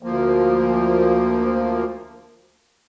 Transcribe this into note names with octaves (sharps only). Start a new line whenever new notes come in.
D2 F3 A#3